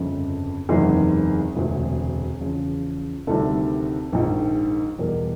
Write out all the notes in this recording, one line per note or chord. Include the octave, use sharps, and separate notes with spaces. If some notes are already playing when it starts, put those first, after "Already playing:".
Already playing: G1 F2 C#3
F#1 E2 C3 D#3 G#3 G#4
E1 D2 C3
E2 C#3 F3
D2 C3 D#3 G3 A4
A#1 G#2 D#3
E2 B2 G3 A#4